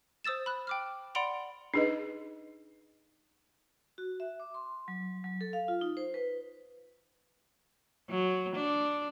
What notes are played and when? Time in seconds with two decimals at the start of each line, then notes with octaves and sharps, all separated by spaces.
0.24 C5 D#6 E6 A6 E7
0.46 B5 F#6
0.67 G5 D6 F6
1.15 D5 F#5 B5 C6 D7 F7
1.74 D4 D#4 G#4 B4 D#5
3.98 F#4
4.20 E5
4.40 D6
4.54 C6
4.88 F#3
5.24 F#3
5.41 A4
5.53 F5
5.68 F4
5.81 D#4
5.97 C5
6.14 B4
8.09 F#3
8.55 D4